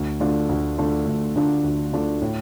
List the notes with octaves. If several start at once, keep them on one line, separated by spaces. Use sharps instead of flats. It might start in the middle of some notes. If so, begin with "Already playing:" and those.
Already playing: D2
D3 A3 D4 F4
D2
D3 A3 D4 F4
D2
D3 A3 D4 F4
D2
D3 A3 D4 F4
A2